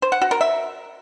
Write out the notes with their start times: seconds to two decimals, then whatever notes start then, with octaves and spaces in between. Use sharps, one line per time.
0.02 C5
0.12 F#5
0.22 F#4
0.31 A#4
0.41 E5